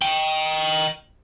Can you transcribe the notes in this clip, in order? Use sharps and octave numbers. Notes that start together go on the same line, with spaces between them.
D#5 G5